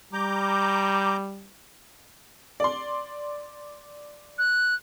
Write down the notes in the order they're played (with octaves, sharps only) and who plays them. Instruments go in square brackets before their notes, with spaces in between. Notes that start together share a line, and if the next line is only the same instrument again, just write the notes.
[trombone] G3 [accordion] A#5 D6 G6
[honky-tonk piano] D5 C6
[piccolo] F#6